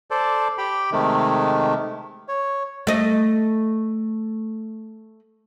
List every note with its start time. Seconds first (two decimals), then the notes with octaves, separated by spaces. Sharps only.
0.11 A4 C5 D5
0.58 G4 G5 B5
0.92 C3 D#3 G#3 A3
2.28 C#5
2.87 A3 D#5